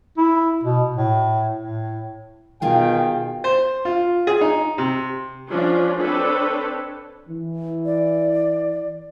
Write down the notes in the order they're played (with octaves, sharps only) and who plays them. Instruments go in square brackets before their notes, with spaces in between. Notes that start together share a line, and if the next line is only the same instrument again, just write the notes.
[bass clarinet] E4
B2
A2
A2
[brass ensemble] B2 D#3 G5 [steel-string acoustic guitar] F4 G#4
[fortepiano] C5
F4
G#4
D#4
C3
[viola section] F3 C#4 D4 F4
C4 D4 A4 B4 C#5
[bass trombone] E3
[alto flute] D5